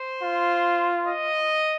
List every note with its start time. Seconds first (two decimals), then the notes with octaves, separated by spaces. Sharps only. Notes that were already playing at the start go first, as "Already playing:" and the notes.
Already playing: C5
0.22 F4
1.07 D#5